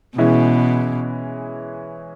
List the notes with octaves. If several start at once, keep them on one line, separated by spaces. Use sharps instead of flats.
B2 E3 G#3 C#4 E4